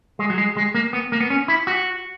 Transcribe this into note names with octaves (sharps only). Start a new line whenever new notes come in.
G#3
F#3
G#3
G#3
A#3
B3
A#3
B3
C#4
E4
F#4